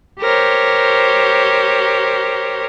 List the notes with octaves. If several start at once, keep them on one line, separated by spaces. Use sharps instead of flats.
G4 A#4 C5 C#5